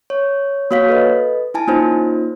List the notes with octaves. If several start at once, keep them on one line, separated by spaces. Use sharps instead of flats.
C#5
A#3 F#4 C#5 F5 B6
A4 B4 D#5
E4 G#5 A5
A#3 C#4 D#4 F4 C5